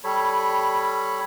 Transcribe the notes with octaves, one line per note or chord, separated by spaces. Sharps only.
G3 A4 C#5 B5